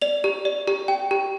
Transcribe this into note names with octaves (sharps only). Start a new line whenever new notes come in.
D5 F7
G4
D5
G4
G5
G4